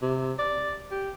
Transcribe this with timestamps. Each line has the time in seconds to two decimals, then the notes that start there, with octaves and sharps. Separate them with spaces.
0.02 C3
0.39 D5
0.91 G4